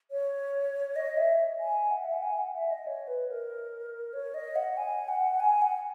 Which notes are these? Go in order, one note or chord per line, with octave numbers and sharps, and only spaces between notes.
C#5
D#5
E5
G#5
F#5
E5
F#5
G#5
F#5
E5
D#5
C#5
B4
A#4
C#5
D#5
F#5
G#5
F#5
G#5
F#5